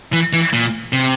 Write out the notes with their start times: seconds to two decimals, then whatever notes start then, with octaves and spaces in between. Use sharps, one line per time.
0.13 E3
0.33 E3
0.53 A#2
0.93 C3